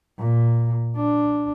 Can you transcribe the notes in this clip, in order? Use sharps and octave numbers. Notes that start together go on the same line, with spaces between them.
A#2
D4